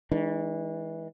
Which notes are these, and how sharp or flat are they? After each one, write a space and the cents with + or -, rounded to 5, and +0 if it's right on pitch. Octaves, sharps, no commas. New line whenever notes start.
E3 -25 G#3 +0 D4 +35